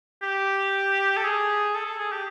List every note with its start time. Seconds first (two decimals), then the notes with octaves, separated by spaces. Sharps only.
0.22 G4
1.17 A4
1.24 G#4
1.74 A4
1.86 A4
1.99 G#4
2.12 G4